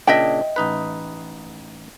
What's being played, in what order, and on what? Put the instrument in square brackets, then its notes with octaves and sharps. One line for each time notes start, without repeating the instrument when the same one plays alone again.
[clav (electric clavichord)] A#2 C#3 D4 [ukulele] D#5 E5 G5
[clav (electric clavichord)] A1 D#4 B4